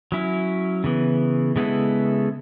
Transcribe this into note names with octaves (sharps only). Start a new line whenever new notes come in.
F#3 C#4 E4
C#3 E3 B3
C#3 G#3 B3 E4 A4